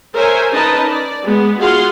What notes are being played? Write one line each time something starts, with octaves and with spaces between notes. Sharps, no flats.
A#4 C5 C#5 E5 G#5
C#4 D#4 A#4 B4 D#5 A5
D5
G#3 B3
F4 F#4 G#4 F5 F#5 C6